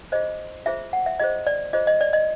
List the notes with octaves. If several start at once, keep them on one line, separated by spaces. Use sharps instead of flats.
F4 G#4 C5 D#5
F4 G#4 C5 E5
F#5
E5
F4 G#4 C5 D#5
D5
F4 G#4 C5 D#5
D#5
D5
D#5